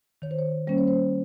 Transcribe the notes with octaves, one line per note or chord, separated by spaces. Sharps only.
D#3 C#5
C5
C#5
G3 A#3 C#4 C5
C#5
C5